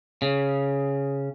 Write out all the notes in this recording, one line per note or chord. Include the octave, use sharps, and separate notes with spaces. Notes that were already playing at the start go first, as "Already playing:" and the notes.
C#3